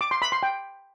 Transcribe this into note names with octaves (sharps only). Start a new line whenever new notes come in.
D6
C6
B5
C6
G5